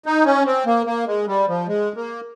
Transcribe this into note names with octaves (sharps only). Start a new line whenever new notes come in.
D#4
C#4
C4
A#3
A#3
G#3
G3
F3
G#3
A#3